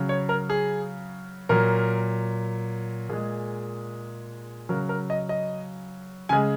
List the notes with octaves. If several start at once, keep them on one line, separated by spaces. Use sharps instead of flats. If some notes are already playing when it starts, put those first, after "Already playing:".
Already playing: C#3 F#3
C#5
A#4
G#4
A#2 F#3 A#4
A#2 G#3 G#4
C#3 F#3 A#4
A#4
D#5
D#5
C#3 G#3 G#5